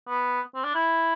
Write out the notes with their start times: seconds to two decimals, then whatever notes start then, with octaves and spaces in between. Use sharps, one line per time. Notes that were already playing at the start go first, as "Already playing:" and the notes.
0.09 B3
0.55 C4
0.64 D4
0.75 E4